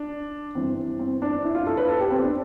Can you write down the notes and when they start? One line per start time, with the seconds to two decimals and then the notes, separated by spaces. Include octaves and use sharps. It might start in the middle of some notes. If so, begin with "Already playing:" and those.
Already playing: D4
0.55 G2 E3 C4
0.99 C4
1.22 D4
1.44 E4
1.55 F4
1.67 A4
1.77 B4
1.89 A4
2.00 G4
2.11 C4
2.22 D4